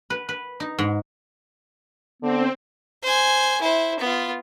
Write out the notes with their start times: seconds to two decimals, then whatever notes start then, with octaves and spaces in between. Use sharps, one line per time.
0.10 B4
0.29 B4
0.60 D#4
0.79 G#2
2.23 D3 B3 C4
3.03 C5 G#5
3.61 E4 C5
3.99 B3 F4